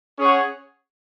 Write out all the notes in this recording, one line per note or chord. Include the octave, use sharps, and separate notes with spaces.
C#4 G#4 C#5 F#5